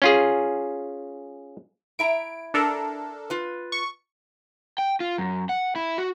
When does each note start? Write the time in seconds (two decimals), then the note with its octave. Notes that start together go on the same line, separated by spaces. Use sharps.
0.02 C#4 F4 G#4
1.99 E4 E5 A#5 D7
2.54 D4 A4 A#4
3.30 F4 B4
3.72 C#6
4.78 G5
5.00 F4
5.18 F#2
5.49 F#5
5.76 E4
5.98 F#4